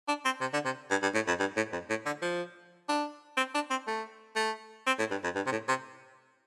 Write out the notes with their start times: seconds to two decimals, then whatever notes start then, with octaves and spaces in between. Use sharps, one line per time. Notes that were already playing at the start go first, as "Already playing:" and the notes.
0.08 D4
0.25 C4
0.41 C3
0.53 D3
0.65 C3
0.90 G2
1.03 G2
1.14 A2
1.27 F2
1.40 G2
1.57 A2
1.73 F2
1.90 A2
2.06 D3
2.22 F3
2.89 D4
3.37 C4
3.54 D4
3.70 C4
3.87 A3
4.36 A3
4.87 C4
4.99 A2
5.11 G2
5.24 F2
5.36 G2
5.47 C3
5.52 A2
5.68 C3